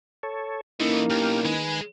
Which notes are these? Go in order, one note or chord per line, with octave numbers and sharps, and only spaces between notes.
A4 C#5
E3 A3 A#3 C#4 D#4 E4 D#5
B1 G4 F6
D#3 G#3 B4 G#5